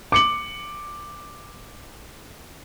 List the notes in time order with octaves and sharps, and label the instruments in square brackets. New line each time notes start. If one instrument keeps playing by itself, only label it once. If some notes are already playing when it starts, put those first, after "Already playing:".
[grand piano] D6 C#7 F#7